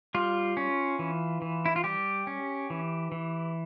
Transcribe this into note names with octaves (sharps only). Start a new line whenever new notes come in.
G3 F4
C#4
E3
E3
E4
F4
G3 G4
C#4
E3
E3